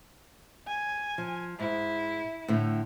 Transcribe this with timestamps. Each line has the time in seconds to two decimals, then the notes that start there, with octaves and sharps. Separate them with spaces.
0.68 G#5
1.18 F3
1.59 G#2 E4
2.48 A2 D3 A3